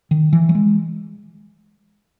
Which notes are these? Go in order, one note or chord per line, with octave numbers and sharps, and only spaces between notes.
D#3
E3
F#3
G#3